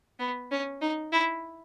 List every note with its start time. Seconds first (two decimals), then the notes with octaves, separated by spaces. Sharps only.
0.19 B3
0.51 C#4
0.81 D#4
1.12 E4